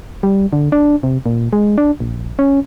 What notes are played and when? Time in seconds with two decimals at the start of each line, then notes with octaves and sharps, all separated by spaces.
0.23 G3
0.53 D3
0.72 D4
1.03 C3
1.26 A#2
1.53 G#3
1.78 D4
2.00 A#1
2.39 C#4